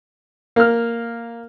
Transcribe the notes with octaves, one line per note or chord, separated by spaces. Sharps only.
A#3 F6